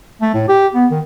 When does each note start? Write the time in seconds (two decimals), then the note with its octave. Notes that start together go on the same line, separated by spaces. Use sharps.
0.21 A3
0.34 A2
0.48 G4
0.74 B3
0.91 D#3